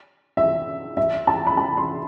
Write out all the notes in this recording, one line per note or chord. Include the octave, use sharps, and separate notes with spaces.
E5
E5
A5
B5
A5
C6